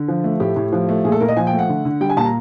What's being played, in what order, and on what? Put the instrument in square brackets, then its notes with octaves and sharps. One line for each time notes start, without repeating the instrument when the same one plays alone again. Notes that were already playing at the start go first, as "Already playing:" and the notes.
Already playing: [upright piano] D3
F3
A3
A2 G4
A2
F3
A3
A#2 G#4
A4
A#2 A#4
D#5
F3 G#5
G5
A3
F#5
D3
D3
G3 G5
G#5
A#2 A5
A#5